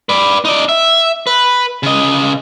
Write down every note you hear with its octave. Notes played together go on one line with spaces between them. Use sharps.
B4 D5
D#4 D5
E5
B4
C#3 D#5